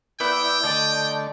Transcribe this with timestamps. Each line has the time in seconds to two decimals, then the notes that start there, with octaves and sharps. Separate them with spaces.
0.20 B3 E4 D5 G5
0.63 D3 A3 D5 D#5 A5